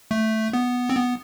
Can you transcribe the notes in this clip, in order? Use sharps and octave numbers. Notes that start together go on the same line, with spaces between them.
A3
B3
C4
B3